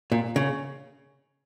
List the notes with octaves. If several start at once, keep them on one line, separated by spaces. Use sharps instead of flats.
A#2
C#3